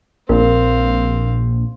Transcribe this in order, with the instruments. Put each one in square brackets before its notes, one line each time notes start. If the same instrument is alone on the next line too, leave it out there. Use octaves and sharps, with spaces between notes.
[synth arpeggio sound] A#1 [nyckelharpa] C4 F5 [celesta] A#4